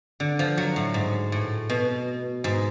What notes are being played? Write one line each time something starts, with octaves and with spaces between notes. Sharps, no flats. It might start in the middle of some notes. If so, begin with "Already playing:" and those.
D3
F3
F#3
A2
G#2
A2
B2
G#2